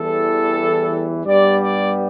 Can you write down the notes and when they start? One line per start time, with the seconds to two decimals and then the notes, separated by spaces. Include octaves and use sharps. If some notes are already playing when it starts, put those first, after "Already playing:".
Already playing: E2 E3 G3 A4
1.25 G2 G3 B3 D5
1.60 D5